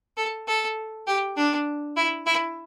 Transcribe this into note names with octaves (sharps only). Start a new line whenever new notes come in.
A4
A4
G4
D4
E4
E4